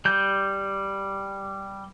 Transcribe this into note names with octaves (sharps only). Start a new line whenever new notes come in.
G3 G6